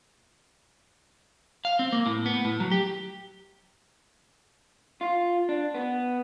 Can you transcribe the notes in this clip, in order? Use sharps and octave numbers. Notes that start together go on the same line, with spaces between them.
F5
C4
A#3
A2
B3
A2
F#3
G4
F4
D4
B3